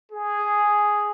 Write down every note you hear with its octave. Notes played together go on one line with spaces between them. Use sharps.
G#4